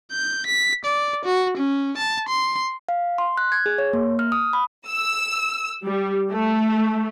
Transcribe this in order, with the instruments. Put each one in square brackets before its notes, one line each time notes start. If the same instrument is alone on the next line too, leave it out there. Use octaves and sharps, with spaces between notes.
[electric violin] G6
B6
D5
F#4
C#4
A5
C6
[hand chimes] F5
C6
F#6
G#6
G#4
C#5
A#3
F6
D#6
B5
[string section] E6
G3
A3